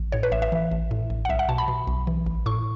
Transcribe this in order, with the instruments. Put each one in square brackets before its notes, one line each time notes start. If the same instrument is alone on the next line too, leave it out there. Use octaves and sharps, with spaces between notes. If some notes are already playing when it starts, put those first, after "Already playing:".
Already playing: [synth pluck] A1
A2 C#5
B4
A1 E5
E5
E3
A1
A2
A1
F#5
B1 E5
F#5
B2 A5
B5
B2
B1
E3
A1
A2 C#6